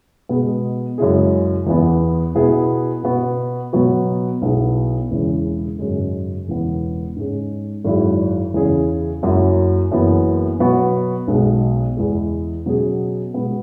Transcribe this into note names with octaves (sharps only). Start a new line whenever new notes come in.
B2 G#3 B3
F#2 C#3 G#3 E4 G#4
E2 E3 B3
B2 B3 E4 G#4
B2 B3 F#4
B2 F#3 B3 F#4
B1 B2 B3 E4 G#4
E1 E2 C#3 E3 C#4
G#1 F#2 C#3 G#3
E1 E2 C#3 E3 B3
G#2 G#3 C#4
G#1 F#2 F#3 E4 G#4
E2 C#3 E3 C#4 G#4
F#1 F#2 F#3 E4
F#1 F#2 E3 B3 E4
B2 F#3 B3 F#4
B1 B2 G#3
E2 E3 G#3
B2 F#3 C#4 G#4
B2 G#3 B3